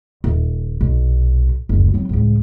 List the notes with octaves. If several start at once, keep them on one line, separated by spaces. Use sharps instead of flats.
D#1
B1 A#2
F#1 D2
F#3 C4
C#2 A2